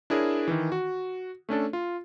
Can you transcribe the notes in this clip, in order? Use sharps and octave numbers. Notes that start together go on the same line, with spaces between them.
D4 E4 G#4 A#4 C#5
D#3 E3
F#4
A3 C#4 D4 A4
F4